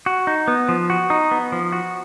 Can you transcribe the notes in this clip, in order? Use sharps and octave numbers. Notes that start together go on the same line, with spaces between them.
F#4
D#4
B3
F3
F#4
D#4
B3
F3
F#4